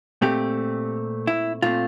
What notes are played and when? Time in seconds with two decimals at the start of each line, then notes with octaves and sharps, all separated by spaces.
0.22 A#2 A3 C4 G4
1.27 E4
1.62 A#2 A3 C4 F4